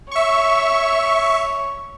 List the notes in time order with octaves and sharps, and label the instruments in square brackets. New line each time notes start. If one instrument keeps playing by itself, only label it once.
[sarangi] C#5 [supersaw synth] E5 C#6